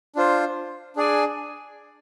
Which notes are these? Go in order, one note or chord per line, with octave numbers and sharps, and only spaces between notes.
D4 F4 C5
D4 G#4 D5 G#5